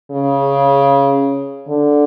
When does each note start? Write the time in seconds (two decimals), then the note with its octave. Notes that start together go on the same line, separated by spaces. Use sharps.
0.11 C#3
1.67 D3